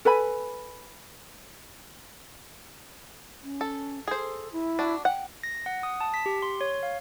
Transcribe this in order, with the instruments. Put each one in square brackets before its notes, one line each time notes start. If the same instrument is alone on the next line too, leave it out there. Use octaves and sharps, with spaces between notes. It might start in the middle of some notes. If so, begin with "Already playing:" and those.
[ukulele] A4 B4 G#5 B5
[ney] C#4
[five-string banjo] A4
[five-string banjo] G#4 C5 [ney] A4
[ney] E4
[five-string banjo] D4 F#4
[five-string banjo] F#5 [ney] G5
[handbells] A#6
F#5
D#6
A5
B6
G4
C6
C#5
F5